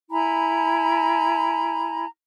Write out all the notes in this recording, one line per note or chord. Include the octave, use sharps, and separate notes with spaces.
E4 G#5 A#5 B5